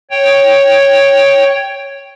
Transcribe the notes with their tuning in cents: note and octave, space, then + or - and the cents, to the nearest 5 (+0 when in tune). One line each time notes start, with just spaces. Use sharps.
C#5 +0 G5 +0